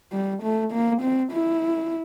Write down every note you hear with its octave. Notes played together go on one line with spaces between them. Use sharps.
G3
A3
A#3
C4
E4